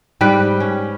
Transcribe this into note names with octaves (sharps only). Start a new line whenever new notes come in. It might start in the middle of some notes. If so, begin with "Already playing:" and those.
G#2 G3 B4 G5
C#4